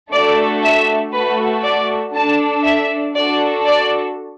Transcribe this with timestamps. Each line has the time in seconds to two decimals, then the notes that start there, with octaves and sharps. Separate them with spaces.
0.11 A3 D4 F#4 A4 D5
0.62 E5
1.13 A3 F#4 A4 B4
1.64 D5
2.14 D4 A4 A5
2.64 E5
3.16 D4 F#4 A4 D5
3.66 D5